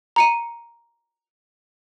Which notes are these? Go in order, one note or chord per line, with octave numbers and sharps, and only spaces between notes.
A#5 C#7 D#7